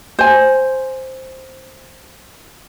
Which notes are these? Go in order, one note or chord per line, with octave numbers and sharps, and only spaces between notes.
C5 G#5